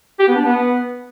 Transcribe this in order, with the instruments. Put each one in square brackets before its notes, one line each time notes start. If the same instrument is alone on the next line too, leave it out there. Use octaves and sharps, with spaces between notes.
[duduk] G4
B3
D4
B3